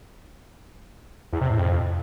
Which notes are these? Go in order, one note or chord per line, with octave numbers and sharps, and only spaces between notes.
E2
C3
A2
F2